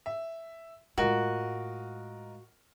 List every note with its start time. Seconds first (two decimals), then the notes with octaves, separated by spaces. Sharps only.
0.06 E5
0.98 A2 G#3 F4 F#4 A#4 D#5